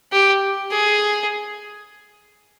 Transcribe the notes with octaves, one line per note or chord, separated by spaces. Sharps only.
G4
G#4